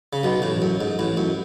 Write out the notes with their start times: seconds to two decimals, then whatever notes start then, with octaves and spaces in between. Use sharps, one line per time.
0.13 C#3
0.23 B1 B2
0.42 A1 A2
0.62 F#2
0.81 G#2
0.99 A1 A2
1.17 F#2